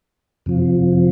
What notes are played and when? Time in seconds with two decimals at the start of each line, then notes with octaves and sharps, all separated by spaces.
0.46 F2 C3 F3